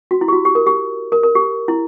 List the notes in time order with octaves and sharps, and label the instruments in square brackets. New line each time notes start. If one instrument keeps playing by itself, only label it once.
[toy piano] F#4
E4
G4
F#4
G4
A#4
G4
A#4
A#4
G4
E4